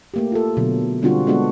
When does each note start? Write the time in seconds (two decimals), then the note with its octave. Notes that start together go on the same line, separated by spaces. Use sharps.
0.14 A3 A#3 G4
0.32 F4 A4
0.57 B2 D3 F#3
1.02 D3 G3 C4 D4 F4 F#4
1.27 G#3 B3 D4 F#4 A4